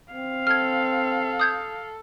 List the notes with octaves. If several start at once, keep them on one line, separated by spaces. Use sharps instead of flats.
C4 F5
A4 F6 G#6
D#6 G6 G#6